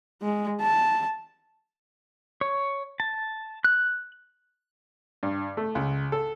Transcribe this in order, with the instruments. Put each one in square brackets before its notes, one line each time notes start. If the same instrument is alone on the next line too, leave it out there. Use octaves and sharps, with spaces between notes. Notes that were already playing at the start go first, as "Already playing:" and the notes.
[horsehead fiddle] G#3
A5
[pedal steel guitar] C#5
A5
F#6
[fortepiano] G2
A3
C#2
A4